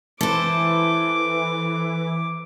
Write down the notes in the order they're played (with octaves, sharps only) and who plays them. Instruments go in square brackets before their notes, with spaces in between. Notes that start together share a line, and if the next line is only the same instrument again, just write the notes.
[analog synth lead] E3 [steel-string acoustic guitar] A4 C5 [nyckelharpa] D6